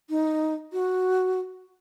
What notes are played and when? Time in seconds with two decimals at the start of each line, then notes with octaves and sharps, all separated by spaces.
0.10 D#4
0.73 F#4